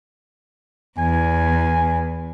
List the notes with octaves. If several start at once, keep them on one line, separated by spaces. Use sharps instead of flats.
E2 G#5